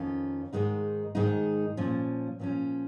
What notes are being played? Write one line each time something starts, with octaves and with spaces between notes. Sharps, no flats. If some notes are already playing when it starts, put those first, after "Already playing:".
Already playing: F2 D#3 C#4 F4
G#2 D#3 G#3 D#4
G#2 D#3 G#3 D#4
A#2 F3 C#4
A#2 F3 C#4